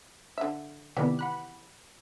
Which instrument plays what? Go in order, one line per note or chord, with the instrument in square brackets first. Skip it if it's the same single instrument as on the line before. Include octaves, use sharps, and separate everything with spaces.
[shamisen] D3 E5
[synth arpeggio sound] C3 D#3 B3 [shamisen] E3 G4 D5
[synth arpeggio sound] F#5 B5 F#6